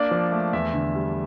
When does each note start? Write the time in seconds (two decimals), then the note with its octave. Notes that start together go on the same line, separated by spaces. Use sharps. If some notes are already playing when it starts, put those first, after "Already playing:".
Already playing: A#3 D4 D5
0.11 F3
0.32 A3
0.53 E2 E5
0.74 D3
0.95 G3